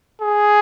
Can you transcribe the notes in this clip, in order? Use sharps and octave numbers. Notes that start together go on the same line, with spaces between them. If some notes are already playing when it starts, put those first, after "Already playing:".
G#4